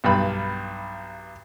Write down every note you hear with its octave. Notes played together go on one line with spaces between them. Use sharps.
B1 G2 B5